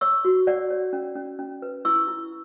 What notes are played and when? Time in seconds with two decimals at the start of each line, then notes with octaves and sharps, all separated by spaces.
0.01 C#5 C#6 E6
0.25 F#4
0.47 C#5 D5 F#5
0.70 C#5
0.93 C#4
1.15 C#4
1.39 C#4
1.62 B4
1.85 E4 C#6 E6
2.07 E4